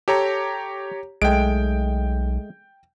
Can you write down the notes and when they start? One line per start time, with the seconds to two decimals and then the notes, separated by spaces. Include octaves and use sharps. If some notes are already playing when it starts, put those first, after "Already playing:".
0.08 G4 A4 C#5 A#5
1.22 B1 G#3 A3 G5 D7